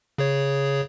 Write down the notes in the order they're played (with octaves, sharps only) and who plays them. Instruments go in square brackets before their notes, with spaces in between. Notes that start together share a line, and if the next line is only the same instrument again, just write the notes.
[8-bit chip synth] C#3 G#4 C#5